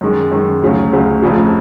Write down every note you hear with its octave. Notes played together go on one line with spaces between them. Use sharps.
F#2 D#3 G#3
F#2 D#3 G#3
D2 C#3 F#3
D2 C#3 F#3
F1 F2 C#3